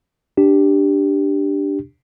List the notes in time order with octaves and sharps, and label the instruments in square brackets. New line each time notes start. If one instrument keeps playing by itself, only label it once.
[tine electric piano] D4 G4